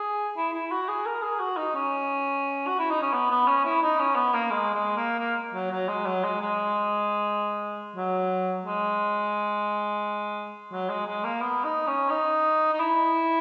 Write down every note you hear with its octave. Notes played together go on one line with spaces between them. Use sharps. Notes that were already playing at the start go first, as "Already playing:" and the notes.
Already playing: G#4
E4
E4
F#4
G#4
A#4
G#4
F#4
D#4
C#4
F#4
E4
D#4
C#4
B3
B3
C#4
E4
D#4
C#4
B3
A#3
G#3
G#3
A#3
A#3
F#3
F#3
G#3
F#3
G#3
G#3
F#3
G#3
F#3
G#3
G#3
A#3
B3
D#4
C#4
D#4
D#4
E4